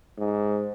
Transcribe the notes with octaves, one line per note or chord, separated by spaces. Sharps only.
G#2